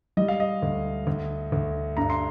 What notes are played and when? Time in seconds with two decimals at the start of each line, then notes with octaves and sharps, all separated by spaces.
0.17 G3 D#5
0.28 F5
0.40 D#5
0.62 D2
1.07 D2
1.52 D2
1.97 G2 A#5
2.10 C6